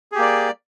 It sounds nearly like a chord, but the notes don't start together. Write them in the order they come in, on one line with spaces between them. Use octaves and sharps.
G#4 G4 A#3 D5